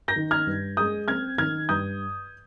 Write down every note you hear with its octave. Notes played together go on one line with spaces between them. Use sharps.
G6 A#6
D#3
F6 G#6
G2
G#3 D#6 G6
C4 F6 G#6
D#3 F6 G#6
G2 D#6 G6